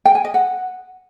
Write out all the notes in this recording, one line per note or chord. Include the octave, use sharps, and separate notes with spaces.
G5
G#5
D#5
F#5